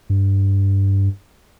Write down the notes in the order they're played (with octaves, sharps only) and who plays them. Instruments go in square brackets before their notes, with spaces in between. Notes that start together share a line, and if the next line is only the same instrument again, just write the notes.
[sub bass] G2